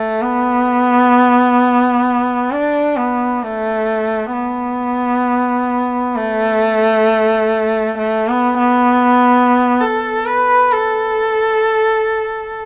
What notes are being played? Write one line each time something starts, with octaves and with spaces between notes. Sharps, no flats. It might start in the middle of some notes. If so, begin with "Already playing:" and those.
Already playing: A3
B3
D4
B3
A3
B3
A3
A3
B3
B3
A4
B4
A4